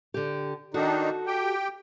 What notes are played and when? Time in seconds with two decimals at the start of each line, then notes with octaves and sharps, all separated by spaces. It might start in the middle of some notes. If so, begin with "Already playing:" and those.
0.14 D3 G4
0.74 D#3 D4 D#4 F#4 A4
1.26 G4 G5